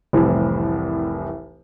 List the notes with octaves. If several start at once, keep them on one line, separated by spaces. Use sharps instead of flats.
F1 C2 A2 E3